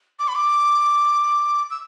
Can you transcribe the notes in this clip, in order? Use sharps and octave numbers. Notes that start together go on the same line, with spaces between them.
D6
B5
D6
E6